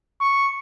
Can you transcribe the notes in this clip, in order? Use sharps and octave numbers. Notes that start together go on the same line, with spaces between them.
C#6